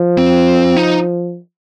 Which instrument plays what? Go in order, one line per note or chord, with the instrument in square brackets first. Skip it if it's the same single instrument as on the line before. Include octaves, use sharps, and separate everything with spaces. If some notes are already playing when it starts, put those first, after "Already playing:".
Already playing: [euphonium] F3
[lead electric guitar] C4
D#4